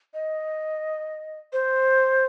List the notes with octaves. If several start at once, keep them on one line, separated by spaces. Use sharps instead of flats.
D#5
C5